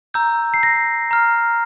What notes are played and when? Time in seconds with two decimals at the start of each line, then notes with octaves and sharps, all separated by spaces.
0.14 A#5 E6 G6
0.54 C7
0.63 A#6
1.11 A#5 F6